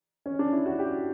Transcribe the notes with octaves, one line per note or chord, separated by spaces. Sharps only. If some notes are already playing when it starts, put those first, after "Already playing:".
C#4
D4
E4
F#4
G4